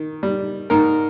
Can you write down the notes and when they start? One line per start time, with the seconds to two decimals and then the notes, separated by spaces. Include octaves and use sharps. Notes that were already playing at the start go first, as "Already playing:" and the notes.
Already playing: D#3
0.23 G3
0.70 G#2 A#4